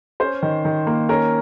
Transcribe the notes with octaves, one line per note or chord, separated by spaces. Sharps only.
C#4 C5
D#3
D#3
A#3
C#4 A#4